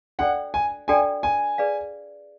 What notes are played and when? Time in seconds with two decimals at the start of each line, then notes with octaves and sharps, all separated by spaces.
0.19 D4 F#4 A4 D5 F#5 G5
0.54 G#5
0.88 D4 F#4 A4 D5 G5 G#5
1.23 G#5
1.58 G#4 B4 D5 F5